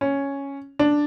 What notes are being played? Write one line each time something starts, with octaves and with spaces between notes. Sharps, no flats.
C#4
D4